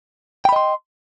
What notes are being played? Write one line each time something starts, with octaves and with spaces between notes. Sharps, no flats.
D#5 G5 B5 C6